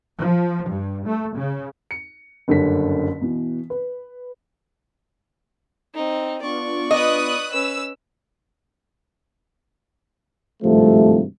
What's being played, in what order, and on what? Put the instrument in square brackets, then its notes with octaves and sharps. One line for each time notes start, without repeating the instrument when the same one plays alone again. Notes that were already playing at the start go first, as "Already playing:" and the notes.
[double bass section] F3
G2
A3
C#3
[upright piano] C#7
F#1 G2 D3 C#4 B6
B2 E3
B4
[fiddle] C4 D#4
[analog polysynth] B3 D4 F4 [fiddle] D5 C#6
[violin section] B4 D#6 F#6 [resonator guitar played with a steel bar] D#5
[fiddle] C#4 B4 [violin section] E6
[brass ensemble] G#1 G2 C3 F3 A3